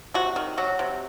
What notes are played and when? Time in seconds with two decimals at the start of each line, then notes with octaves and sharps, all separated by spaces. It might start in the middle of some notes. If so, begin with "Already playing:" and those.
0.14 C3 F#4
0.36 D#3
0.58 F#3 F#4
0.79 C3